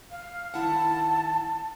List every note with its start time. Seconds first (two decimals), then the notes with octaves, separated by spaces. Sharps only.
0.11 F5
0.54 D#3 E4 F#5 A5